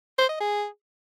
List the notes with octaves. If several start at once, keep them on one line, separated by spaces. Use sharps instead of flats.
C5
D#5
G#4